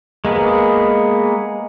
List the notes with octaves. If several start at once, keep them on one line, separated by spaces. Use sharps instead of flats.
G#3 A#3 B3 G#4